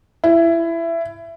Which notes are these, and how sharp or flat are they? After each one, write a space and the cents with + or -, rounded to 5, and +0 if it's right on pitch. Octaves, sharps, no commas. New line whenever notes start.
E4 +20